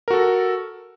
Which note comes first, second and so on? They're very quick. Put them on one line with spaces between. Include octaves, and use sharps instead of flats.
A#4 F#4 A4